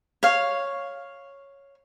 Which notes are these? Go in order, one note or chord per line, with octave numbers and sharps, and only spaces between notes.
C#5 F5